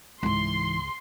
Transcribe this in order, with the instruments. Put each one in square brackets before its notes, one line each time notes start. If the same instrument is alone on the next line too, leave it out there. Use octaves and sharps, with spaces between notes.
[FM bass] C#2 [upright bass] G#2 E3 [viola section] C6